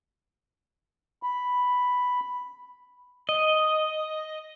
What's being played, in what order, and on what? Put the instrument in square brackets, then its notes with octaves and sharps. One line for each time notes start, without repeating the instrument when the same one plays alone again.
[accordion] B5
[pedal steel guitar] D#5